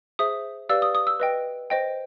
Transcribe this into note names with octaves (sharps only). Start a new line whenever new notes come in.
G#4 C5 E5 D#6
G4 B4 D5 F5 E6
D#6
D#6
E6
B4 D#5 G5
C5 D#5 G5